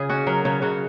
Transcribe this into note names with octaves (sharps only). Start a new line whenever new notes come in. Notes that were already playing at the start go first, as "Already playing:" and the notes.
Already playing: C#3 G#4
C#4 F#4
F#3 A#4
C#3 C#5
C#3 F#4